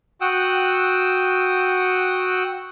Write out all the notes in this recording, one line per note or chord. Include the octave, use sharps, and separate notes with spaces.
F#4 F#5 G5 D#6 E6